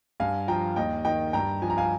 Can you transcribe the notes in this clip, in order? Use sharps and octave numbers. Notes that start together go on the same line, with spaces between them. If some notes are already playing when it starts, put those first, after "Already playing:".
G2 F5 G#5
F3 G5 A#5
D#2 D#5 G5
D#3 D#5 G5
G2 G5 A#5
F3 G#5
A#5
F5 G#5